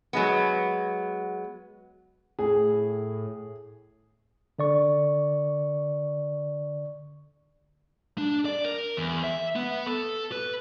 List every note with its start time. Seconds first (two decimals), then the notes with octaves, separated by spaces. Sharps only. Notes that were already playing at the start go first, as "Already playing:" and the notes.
0.13 F#3 G#3 B3
2.39 A2 G#4
4.59 D3 D5 C#6
8.18 D4
8.45 D5
8.64 A#4
8.97 E2
9.24 E5
9.56 B3
9.86 A4
10.32 B4